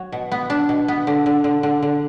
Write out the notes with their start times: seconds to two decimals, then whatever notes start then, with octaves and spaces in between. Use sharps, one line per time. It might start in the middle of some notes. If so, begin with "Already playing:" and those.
Already playing: F#3
0.12 B2
0.32 B3
0.50 D4
0.69 B2
0.88 B3
1.07 D3
1.26 D3
1.44 D3
1.63 D3
1.83 D3